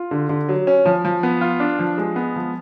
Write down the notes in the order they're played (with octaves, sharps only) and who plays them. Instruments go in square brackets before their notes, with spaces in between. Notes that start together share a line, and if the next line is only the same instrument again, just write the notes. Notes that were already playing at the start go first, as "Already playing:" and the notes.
Already playing: [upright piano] F4
D3
D3
F#3
C#4
F3
F3
B3
F4
D4
F3
G#3
B3
F3